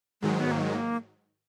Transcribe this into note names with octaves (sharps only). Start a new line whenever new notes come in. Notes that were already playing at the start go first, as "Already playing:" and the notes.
G#2 D#3 F#3 G#3
B3
A#3
G#3
A#3